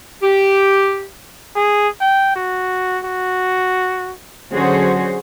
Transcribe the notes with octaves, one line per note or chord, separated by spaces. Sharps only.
G4
G#4
G5
F#4
F#4
D3 F#3 C#4 F#4 G#4 C5